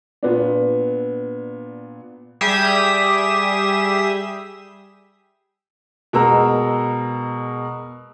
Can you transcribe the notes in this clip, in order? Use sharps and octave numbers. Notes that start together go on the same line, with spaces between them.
A#2 B3 D4
G3 G4 G#4 E5 D#6 E7
B2 G#3 A#4 A#5 E6